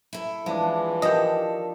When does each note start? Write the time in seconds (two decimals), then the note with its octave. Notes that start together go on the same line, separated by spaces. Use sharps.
0.13 E4 A4
0.46 E3 F3 G#3 D4
1.02 D#3 G4 A4 D#5